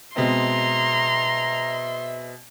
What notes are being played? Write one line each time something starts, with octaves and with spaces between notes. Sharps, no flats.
B2 G#3 C4 E5 A#5 C6